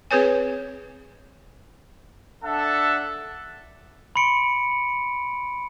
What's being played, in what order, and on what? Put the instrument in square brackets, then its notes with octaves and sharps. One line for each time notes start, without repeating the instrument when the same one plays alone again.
[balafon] C4 G#4 B4 C#5 G#5
[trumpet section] D4 A4 E5 F#5 A5
[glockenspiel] B5 C6 C#7 D7